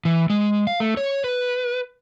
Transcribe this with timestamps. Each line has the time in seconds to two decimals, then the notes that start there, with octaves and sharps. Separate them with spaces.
0.05 E3
0.30 G#3
0.67 F5
0.80 A3
0.97 C#5
1.24 B4